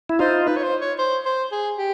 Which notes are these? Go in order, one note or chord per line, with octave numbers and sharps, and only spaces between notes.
E4
D#4 F4 C5
B4
C#5
C5
C#5
C5
C5
G#4
G4